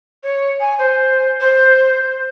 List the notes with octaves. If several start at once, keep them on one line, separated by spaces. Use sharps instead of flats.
C#5
G#5
C5
C5